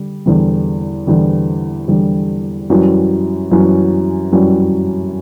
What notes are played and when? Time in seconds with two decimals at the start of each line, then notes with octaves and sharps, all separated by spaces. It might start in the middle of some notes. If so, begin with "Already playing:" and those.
Already playing: D3 G3
0.26 E2 D3 G3
1.07 E2 D3 G3
1.88 E2 D3 G3
2.70 F#2 E3 G3 C#4 F#4
3.51 F#2 E3 G3 C#4 F#4
4.32 F#2 E3 G3 C#4 F#4